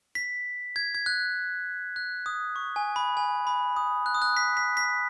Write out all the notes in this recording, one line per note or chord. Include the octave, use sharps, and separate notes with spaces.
B6
G#6
G#6
F#6
F#6
D#6
C#6
G#5
B5
G#5
B5
D#6
F#6
D#6
F#6
B6
B6
B6